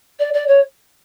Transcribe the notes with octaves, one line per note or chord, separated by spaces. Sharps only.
D5
D5
C#5